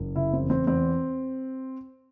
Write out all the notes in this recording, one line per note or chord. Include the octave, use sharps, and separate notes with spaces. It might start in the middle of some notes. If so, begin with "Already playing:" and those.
Already playing: F#1
C#3 E4
C4
E2
C4
E2 C4